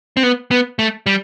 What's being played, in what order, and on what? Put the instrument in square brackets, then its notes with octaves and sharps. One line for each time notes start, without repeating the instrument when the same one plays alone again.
[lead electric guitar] C4
B3
B3
A3
G3